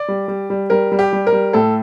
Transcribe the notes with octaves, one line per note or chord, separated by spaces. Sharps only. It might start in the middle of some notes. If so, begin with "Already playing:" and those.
Already playing: D5
G3
G3
G3
G3 A#4
G3
G4
G3
A#4
G3
A2 A4